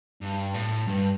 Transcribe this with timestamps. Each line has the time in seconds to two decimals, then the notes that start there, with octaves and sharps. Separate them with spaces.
0.21 G2
0.54 A2
0.87 G2